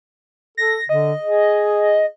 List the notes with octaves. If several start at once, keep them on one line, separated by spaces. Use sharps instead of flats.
A4 A#6
D3 D#5
G#4